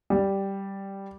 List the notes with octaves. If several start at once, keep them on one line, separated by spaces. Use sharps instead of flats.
G3